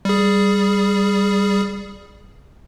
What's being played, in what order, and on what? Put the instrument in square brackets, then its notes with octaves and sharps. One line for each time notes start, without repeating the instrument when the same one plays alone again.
[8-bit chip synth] G3 G#4